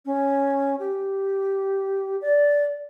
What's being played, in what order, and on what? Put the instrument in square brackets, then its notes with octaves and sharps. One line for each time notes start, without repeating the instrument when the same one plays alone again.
[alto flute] C#4
G4
D5